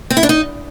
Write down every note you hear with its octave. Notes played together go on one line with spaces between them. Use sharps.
C4
E4
D4
D#4